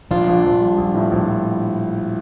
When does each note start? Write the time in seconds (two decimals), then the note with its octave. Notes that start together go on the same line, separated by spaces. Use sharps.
0.11 A#1 D4 F4
0.28 A#1
0.45 A#1
0.61 G3
0.78 A#1
0.94 A2
1.11 A#1